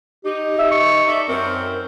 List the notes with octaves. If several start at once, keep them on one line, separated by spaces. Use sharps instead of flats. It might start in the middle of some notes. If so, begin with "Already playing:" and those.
D#4 G4
E5
C#6
A4 D5 E5
F#2 C4 A#4